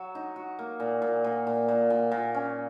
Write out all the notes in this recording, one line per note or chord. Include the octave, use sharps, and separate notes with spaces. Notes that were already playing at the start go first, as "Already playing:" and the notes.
Already playing: F#3 F#4
D#4
F#4
A#3
A#2
A#2
A#2
A#2
A#2
A#2
A#2
C#4